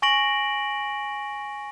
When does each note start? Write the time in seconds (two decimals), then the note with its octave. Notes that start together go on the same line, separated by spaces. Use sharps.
0.02 G#5 C#6 A#6 D7 F#7